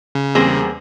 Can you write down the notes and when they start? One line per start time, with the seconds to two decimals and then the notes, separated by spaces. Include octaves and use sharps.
0.15 C#3
0.35 E2 G3 A#3 C4 G#4